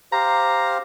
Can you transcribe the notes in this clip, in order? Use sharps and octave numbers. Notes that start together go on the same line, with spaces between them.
G4 C5 F5 A#5